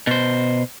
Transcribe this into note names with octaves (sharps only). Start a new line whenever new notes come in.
B2 C5